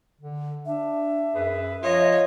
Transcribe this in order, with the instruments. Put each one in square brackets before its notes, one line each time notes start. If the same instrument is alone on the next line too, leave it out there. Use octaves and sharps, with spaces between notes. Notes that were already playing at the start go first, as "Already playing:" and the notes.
[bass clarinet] D3
[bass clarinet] D4 [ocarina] E5
[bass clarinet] F#2 [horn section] G#4 B4
[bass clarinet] F3 [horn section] F4 D#5 [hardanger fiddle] C#5